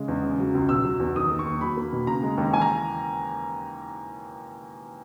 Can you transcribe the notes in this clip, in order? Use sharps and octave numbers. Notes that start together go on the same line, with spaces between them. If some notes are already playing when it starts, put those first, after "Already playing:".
Already playing: C#3 G#3
E2
C#3
F#3
C#2
B2 E6
F#3
E2
D#3 D#6
A#3
C#6
D#2
F#3 B5
A#3
B2
C#3 A#5
G#3
D#2
E3 G#5
A#5